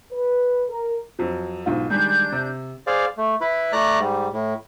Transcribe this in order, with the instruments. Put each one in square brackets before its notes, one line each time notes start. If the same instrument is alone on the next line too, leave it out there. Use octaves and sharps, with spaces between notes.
[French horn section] B4
A#4
[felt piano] F2 F#3
B1 G#2 F4
[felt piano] D#3 G3 G#3 [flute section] D4 G6
[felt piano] C3
[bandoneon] G#4 C5 D5 F5
A3
E4 B4
A3 D5 A#5 F#6
G#2 G3
A2